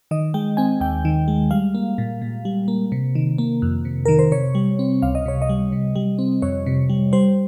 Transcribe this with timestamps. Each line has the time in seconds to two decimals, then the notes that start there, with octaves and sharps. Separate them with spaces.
0.11 D#3 D#5
0.34 G#3 G5
0.57 C4 G#5
0.80 D#2 G5
1.05 D#3
1.28 G#3
1.51 G3 F5
1.75 A#3
1.98 A#2
2.22 A#2
2.45 G3
2.68 A#3
2.92 C3
3.15 D#3
3.38 A#3
3.62 F2
3.85 C3
4.06 D#3 A#4
4.19 C5
4.32 C3 C#5
4.55 G3
4.79 C4
5.02 C#2 F5
5.15 D#5
5.26 C3 C#5
5.42 D#5
5.49 G3
5.72 C3
5.96 G3
6.19 C4
6.42 F2 C#5
6.66 C3
6.90 G3
7.13 G3 C5